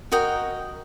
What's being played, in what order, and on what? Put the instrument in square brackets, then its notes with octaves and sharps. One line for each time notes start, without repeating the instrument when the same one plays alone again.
[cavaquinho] F#4 A#4 D#5 G5